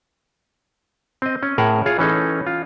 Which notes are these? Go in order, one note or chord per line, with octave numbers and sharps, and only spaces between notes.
C4 D#5
C#4
A2 G#4 A#4 E5 F#5
F4 G#4 C#5
E3 C#4 D#4 A4
F4